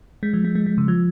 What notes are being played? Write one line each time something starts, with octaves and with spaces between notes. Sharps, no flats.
G#3
F3
G#3
G#3
G#3
C#3
F3